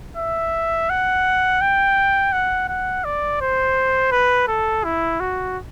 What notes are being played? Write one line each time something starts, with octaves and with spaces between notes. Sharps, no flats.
E5
F#5
G5
F#5
F#5
D5
C5
B4
A4
E4
F#4